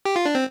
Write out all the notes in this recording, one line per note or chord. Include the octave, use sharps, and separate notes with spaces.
G4
F4
D4
C4